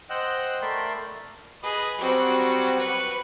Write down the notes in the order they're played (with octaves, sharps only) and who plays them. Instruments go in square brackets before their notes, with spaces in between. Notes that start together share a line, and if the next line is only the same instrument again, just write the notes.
[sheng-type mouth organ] C5 D#5 F#5 G5 E6 F#6
A3 A#4 D5 E5 B5 C6
[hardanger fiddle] G#4 [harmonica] B4 D#5
[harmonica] F#3 G3 [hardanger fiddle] C4 F#4
[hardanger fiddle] B4 C#6